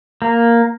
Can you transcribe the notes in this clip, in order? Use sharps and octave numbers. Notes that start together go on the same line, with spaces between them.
A#3